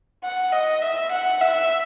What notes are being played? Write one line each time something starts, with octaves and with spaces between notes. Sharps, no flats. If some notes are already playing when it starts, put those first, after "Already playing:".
F#5
D#5
E5
F#5
E5